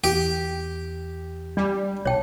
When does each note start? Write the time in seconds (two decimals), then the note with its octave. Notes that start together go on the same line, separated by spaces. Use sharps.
0.04 E2 G4
1.57 G3 D4
2.05 B1 C#5 G5 A5